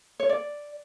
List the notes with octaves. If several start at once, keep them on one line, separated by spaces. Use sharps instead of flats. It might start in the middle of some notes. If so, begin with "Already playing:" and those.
C#5
D5